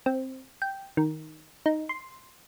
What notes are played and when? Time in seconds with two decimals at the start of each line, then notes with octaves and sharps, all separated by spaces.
0.06 C4
0.62 G5
0.97 D#3
1.66 D#4
1.89 C6